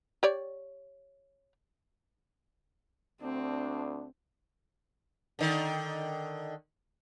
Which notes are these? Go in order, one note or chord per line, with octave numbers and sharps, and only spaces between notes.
G4 C#5 D5
D2 C4 D4
D3 D#3